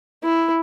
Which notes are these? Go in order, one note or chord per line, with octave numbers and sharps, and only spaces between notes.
E4